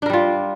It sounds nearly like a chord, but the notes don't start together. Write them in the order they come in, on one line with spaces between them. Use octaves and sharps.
D4 A#4 G3 F4